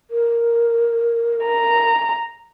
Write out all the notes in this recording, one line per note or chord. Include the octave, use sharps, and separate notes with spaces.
A#4
A#5